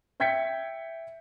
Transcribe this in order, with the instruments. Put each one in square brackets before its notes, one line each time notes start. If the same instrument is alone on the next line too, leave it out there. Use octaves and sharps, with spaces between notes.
[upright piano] E5 G5 G6 G#6 B6 C#7